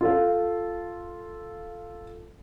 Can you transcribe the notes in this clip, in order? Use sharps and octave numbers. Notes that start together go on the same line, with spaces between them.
F4 A4 F5